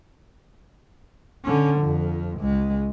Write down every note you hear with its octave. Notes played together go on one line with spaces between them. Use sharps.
D3 C#4
F2 F3
C#2 G#3